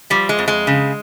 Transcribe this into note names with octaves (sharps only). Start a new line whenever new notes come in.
F3 G3
G#3
F2
G#3
C#3